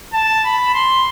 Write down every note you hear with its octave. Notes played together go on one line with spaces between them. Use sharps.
A5
B5
C6